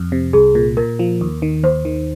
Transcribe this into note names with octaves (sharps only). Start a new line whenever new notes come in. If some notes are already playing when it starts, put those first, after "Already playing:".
Already playing: F2
C3
C2 G#4
A#2
A#2 A#4
F3
D#2
D#3
D#2 C5
D#3